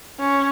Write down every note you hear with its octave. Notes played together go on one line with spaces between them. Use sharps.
C#4